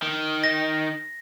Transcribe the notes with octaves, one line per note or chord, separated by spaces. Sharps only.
D#3
A#6